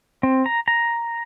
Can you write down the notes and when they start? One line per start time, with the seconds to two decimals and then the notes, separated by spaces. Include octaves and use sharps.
0.23 C4
0.46 A#5
0.68 A#5